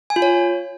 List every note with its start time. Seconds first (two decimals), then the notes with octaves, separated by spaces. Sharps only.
0.10 G#5
0.16 F4
0.22 C#5